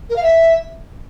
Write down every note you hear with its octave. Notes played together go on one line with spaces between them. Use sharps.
A#4
F5
E5